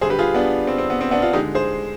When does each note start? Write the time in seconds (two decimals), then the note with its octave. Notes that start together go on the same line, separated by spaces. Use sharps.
0.01 D3 G3 G#4 C5
0.10 G4 B4
0.19 F4 G#4
0.34 B3 D4
0.67 C4
0.78 C4
0.90 B3
1.01 C4
1.11 B3 D4
1.22 D4 F4
1.33 D3 G#3 D#4 G4
1.55 G#4 C5